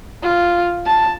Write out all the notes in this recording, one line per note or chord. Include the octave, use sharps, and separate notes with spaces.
F4
A5